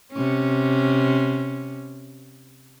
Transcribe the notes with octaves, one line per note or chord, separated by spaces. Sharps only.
C3 C#4